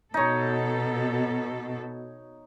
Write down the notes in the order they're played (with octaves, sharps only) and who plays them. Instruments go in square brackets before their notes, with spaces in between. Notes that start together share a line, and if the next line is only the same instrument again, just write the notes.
[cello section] B2 A4 [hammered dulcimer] D#4 C#5